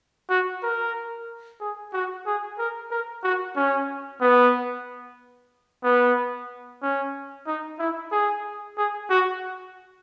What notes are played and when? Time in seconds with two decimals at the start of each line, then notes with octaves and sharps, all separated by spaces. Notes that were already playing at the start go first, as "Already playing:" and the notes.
0.30 F#4
0.63 A#4
1.61 G#4
1.93 F#4
2.26 G#4
2.58 A#4
2.91 A#4
3.24 F#4
3.56 C#4
4.21 B3
5.84 B3
6.82 C#4
7.46 D#4
7.79 E4
8.12 G#4
8.77 G#4
9.10 F#4